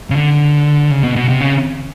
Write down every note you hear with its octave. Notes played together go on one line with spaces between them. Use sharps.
C#3
D3
C#3
B2
B2
C3
C#3